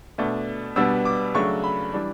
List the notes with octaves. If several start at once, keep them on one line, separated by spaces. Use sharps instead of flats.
B2 A3 D4
B2 G3 B3 D4 E6
D6
C#3 F#3 A3 D4 C#6
B5
E3 G3 D4